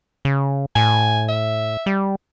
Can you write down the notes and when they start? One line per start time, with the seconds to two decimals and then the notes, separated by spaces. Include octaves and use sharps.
0.25 C#3
0.75 A2 G#5
1.28 E5
1.86 G3